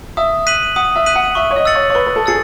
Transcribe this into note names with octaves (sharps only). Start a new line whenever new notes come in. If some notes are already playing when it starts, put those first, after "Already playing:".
E5 D#6
F#6 B6 D#7 F#7
F#5 D#6
E5
F#6 B6 D#7 F#7
F#5
E5 C#6
C#5
D#5
E6 A6 C#7 F#7
C#5
C#5
B4 C#6
B4
A4
G#4 E6 A6 C#7